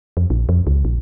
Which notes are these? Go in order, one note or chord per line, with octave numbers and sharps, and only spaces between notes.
F2
A#1
F2
C#2
A#1